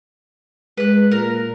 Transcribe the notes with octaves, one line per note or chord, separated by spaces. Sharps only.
G#3 B4 F#6
A#2 A#4